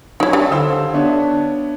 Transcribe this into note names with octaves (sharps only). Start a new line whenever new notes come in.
F#3 C#4 D#4 E4
G3 D4
D3 C5 F5 E6
B3 D4 C#5 E5